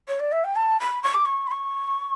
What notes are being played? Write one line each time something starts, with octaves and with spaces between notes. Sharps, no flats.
C#5
D5
E5
G5
A5
B5
C#6
D6
C#6
B5
C#6